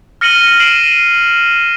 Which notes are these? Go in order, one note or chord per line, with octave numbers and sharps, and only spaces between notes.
F6 A#6 C#7 D#7 F#7 G7
C7 D7 E7 F#7